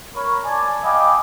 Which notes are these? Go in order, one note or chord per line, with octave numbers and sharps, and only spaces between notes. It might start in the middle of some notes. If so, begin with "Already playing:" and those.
A#4 C#5 B5
D5 G#5 A5
D#5 F5 G5 G#5 B5 D6